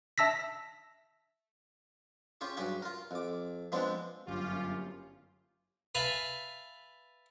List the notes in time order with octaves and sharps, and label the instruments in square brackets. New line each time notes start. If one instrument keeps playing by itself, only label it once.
[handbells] E5 A5 E6 A#6 B6
[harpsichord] C#4 F4 G4 G#4
G2 F#3 G4 G#4 G5
F4 A#4
F2 D6
F3 G#3 B3 C4 D4
[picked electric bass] G1 F#2 [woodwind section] C#4 G4 [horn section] F4
[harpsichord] B4 E5 F5 G#5 A5 B5